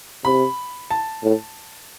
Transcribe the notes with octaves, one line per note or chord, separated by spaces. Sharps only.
C3 B5
A5
A2